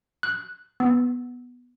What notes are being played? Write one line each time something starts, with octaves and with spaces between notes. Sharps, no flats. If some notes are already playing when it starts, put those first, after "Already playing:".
F#6
B3